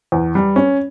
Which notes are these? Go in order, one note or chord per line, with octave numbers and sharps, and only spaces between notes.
E2
G3
C#4